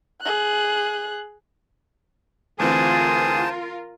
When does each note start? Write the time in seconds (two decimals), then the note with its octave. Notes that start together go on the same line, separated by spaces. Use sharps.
0.22 G#4 F#6
2.60 D2 E3 C4 F4 G#4 A#4 C5 A5